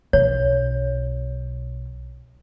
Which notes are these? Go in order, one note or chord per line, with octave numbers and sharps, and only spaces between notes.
B1 C#5